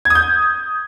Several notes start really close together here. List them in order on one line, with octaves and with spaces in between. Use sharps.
G#6 D#6 G6